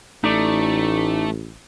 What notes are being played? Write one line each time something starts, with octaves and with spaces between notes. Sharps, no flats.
A1 A3 D#4 D5